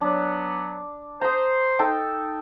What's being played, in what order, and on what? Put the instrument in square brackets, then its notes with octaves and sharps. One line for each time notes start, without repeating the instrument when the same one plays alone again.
[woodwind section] F#3 B3 [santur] D4
[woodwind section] C5 [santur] A#5 D#6
[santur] D#4 A4 G5